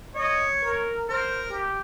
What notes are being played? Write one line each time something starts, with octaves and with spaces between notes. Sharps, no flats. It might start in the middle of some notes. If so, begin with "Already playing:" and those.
C#5 D#5
A#4
A#4 C5
G4